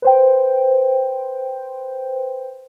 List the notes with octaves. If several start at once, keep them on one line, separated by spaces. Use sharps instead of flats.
B4 C5 G5